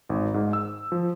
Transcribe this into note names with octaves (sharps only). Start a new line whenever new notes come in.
G#1
G#2
E6
F3